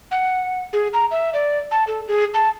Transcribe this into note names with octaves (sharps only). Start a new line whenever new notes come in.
F#5
G#4
A#5
E5
D5
A5
A4
G#4
A5